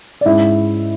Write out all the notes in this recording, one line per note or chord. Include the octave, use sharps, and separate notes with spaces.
D5
G#2 G#3 C#4 E4 E5